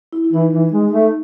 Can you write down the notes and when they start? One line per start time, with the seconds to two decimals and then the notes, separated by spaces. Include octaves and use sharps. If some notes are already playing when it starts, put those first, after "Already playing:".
0.13 E4
0.24 E4
0.33 E3 D#4
0.53 E3
0.73 G#3
0.92 A3
1.02 D#4